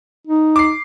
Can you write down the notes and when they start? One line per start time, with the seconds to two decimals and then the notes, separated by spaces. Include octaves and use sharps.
0.27 D#4
0.56 D6 C7